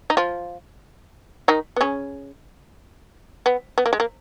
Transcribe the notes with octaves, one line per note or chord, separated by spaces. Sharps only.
D#4
F3 F4
D#3 D#4
B3
C#3 C#4
B3
B3
A#3
G#3
A#3